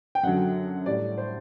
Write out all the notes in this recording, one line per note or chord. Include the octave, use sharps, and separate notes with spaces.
G5
F#2 D3 F#3 F#5
A2 G3 D5
C5